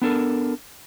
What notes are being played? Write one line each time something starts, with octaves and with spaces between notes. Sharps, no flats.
B3 D4 A4 A#4